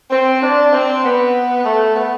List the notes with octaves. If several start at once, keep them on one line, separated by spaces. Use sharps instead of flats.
C4
D4
C4
B3
A3
B3